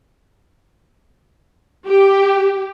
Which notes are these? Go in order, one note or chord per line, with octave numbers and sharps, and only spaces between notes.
G4